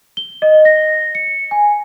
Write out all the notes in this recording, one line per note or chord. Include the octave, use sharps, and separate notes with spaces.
G7
D#5
A#6
C#7
G#5